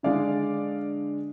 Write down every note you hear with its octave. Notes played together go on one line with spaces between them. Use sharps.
D3 G#3 D4 D5 F5